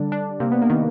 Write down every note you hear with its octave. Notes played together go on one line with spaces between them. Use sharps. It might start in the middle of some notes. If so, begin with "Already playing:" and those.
Already playing: D3 G3 D4
D4
C3 A#3
B3
A#3
D#3 B3